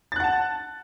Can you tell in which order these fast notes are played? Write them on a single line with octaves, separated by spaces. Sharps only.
A6 F#6 F#5 A5